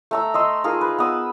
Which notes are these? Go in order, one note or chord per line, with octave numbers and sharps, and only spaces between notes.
A3 A#5 E6
D#5 C6 E6
D#4 F4 G#4 A#4
B4
B3 D#6 E6